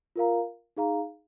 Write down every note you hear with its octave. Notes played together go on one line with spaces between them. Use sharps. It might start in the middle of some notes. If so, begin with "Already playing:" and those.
F4 A#4 F5 A#5
D#4 G#4 F5 A#5